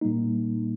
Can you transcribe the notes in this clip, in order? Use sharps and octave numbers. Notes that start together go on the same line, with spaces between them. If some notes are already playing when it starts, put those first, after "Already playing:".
A#2 G3 A#3 D#4